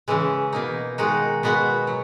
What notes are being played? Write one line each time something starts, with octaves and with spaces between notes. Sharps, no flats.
C#3 E3 G#3
B2 A#3 D#4
D#3 G#3 D#4 F#4
B2 G#3 B3 F#4
F#3